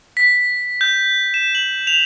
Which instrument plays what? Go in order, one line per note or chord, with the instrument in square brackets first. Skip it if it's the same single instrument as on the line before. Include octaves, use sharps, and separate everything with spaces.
[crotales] B6
G6
E7
F#7
F7